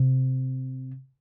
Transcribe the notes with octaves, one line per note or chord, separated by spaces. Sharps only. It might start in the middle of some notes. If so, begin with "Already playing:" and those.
Already playing: C3